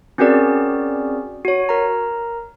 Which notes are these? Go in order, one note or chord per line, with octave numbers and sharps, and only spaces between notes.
C4 C#4 F#4 G#4 A#4 D5
F#4 C#5
A#4 A#5